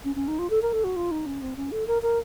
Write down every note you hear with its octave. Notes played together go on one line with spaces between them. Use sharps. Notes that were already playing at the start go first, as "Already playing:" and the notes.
C#4
C#4
D#4
F4
A4
A#4
A4
F#4
F4
D#4
C#4
C4
C#4
A4
A#4
A#4